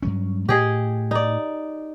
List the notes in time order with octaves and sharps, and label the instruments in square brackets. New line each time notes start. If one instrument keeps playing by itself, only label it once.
[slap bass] G2 F#3 C#4
[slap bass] A2 [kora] G4 G#4 D#5
[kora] D#4 D5